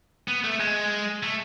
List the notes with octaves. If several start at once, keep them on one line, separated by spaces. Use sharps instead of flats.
B3
A3
G#3
A3